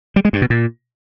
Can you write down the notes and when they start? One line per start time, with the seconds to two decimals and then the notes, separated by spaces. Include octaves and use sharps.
0.16 G3
0.25 G#3
0.33 G2
0.42 B2
0.50 A#2